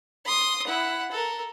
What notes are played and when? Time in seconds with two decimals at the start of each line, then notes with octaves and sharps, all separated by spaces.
0.25 C6 D#6
0.67 E4 F#5
1.11 A4 A#4